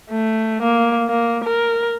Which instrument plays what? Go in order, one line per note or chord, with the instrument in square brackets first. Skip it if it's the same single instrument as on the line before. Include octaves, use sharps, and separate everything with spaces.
[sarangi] A3
A#3
A#3
A#4